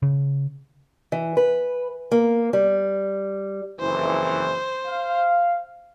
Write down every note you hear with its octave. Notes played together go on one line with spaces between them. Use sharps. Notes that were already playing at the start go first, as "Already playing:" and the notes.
C#3
E3
B4
A#3
G3
F#1 F2 E3 C5
F5